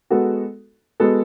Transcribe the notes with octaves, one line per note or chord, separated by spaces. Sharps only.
G#3 B3 F#4 A4
G#3 B3 F#4 A4